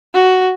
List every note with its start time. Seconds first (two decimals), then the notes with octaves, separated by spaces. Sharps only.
0.14 F#4